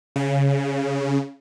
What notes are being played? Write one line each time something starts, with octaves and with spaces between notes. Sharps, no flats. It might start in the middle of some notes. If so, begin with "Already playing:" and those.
C#3